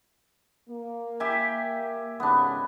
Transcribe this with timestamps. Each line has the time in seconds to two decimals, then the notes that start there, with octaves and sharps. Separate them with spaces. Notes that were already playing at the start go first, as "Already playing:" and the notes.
0.69 A#3
1.20 G4 E5 G#5
2.20 D#2 G#2 C#3 B3 D4